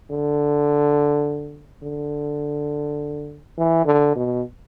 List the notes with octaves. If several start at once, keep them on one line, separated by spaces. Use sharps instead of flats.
D3
D3
E3
D3
B2